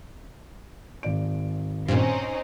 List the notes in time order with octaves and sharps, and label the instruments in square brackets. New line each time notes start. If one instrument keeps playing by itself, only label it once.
[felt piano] G#1 D5 D7
[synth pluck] G2 A#2 [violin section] C4 C#4 D#4